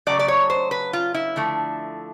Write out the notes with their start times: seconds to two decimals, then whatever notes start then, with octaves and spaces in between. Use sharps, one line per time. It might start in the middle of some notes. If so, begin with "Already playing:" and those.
0.07 C#3 F#3 A3 D5
0.19 D5
0.28 C#5
0.50 C5
0.71 B4
0.93 F4
1.14 E4
1.36 D3 F3 A3